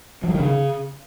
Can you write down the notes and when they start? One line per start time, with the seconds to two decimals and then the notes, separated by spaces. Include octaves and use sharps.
0.24 F3
0.29 F#3
0.34 D#3
0.40 C#3